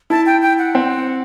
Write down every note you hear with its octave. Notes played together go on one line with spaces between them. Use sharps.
E4 A5
G5
G5
F#5
C4